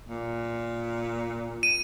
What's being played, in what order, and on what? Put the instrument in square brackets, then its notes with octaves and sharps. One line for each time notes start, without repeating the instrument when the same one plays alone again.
[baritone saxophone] A#2
[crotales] D#7